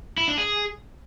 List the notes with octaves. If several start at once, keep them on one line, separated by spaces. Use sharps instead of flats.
E4
D4
G#4